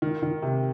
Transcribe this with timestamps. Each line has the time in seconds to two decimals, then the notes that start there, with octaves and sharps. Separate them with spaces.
0.02 D#3
0.22 D#3
0.42 C3